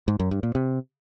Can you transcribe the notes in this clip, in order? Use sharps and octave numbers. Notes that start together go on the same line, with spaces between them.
G#2
F#2
G2
A#2
C3